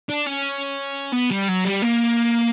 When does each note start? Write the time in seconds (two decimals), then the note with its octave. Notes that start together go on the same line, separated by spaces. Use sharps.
0.10 D4
0.27 C#4
1.13 B3
1.30 G3
1.48 F#3
1.65 G3
1.82 A#3